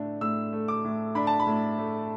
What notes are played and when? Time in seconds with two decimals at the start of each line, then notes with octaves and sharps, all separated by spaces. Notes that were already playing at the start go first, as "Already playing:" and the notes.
Already playing: A2 A3 D4
0.21 A2 E6
0.52 A3
0.68 D6
0.84 A2
1.15 D4 B5
1.27 A5
1.39 B5
1.47 A2
1.78 A3